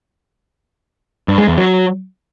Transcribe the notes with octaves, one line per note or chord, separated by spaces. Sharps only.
G2
G#3
E2
F#3